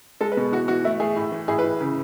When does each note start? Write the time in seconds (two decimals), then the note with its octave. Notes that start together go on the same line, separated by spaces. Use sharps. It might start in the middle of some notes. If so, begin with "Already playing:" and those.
0.21 G#3 A4
0.32 B4
0.37 B2
0.52 E3 F#4
0.68 E3 F#4
0.84 A3 E4
1.00 A3 G#4
1.16 A2
1.32 E3
1.48 A2 G#4
1.59 B4
1.63 A2
1.80 C#3